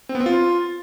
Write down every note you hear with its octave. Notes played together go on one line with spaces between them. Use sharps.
C4
B3
C4
F4